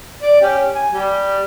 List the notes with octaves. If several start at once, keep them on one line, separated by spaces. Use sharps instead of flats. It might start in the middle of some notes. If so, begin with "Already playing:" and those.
D5
C#4 G4
G#5
G3